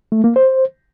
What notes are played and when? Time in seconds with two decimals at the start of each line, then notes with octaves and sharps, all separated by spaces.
0.12 A3
0.24 A#3
0.36 C5